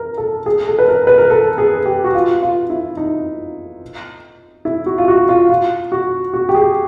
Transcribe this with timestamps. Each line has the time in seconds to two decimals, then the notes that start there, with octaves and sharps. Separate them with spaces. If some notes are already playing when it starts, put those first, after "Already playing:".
Already playing: A#4
0.18 A4
0.46 G#4
0.67 A4
0.79 B4
0.88 A#4
1.07 B4
1.18 A#4
1.30 A4
1.58 G#4
1.85 G4
2.04 F#4
2.15 F4
2.43 F4
2.70 E4
2.97 D#4
4.65 E4
4.86 F#4
4.98 F4
5.08 F#4
5.29 F4
5.50 F4
5.92 F#4
6.33 F#4
6.49 G4
6.54 G#4